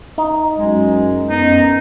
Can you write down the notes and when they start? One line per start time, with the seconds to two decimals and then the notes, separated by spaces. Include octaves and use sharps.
0.18 D#4
0.58 F#2 G#3
1.30 F#2 B3 D#4